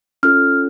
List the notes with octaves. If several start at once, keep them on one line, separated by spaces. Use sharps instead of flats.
C#4 F4 A4 F6